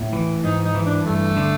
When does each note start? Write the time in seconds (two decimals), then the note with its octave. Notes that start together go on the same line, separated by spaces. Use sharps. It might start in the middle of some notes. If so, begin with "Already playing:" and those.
Already playing: A2
0.13 E3
0.44 G#2 D#4
0.64 D#4
0.75 E3
0.85 D4
1.05 G2 A3
1.37 D3